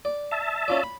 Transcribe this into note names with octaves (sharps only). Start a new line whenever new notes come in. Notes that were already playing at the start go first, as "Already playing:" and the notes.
D5
E5 A5
C#4 F4 D5
B5